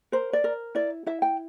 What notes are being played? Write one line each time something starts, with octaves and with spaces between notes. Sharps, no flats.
A#4 C5
D5
A#4
E4 D5
E4 E5
G5